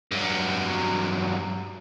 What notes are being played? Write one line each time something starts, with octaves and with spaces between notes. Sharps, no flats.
G2 F#3